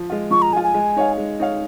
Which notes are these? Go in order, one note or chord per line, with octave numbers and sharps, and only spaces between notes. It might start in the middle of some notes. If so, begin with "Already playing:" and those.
Already playing: F3
G#3 F4
F3 C#6
A#5
G#3 F4 G#5
G#5
G#3
D#4 C#5 F5
G#3
D#4 C#5 F5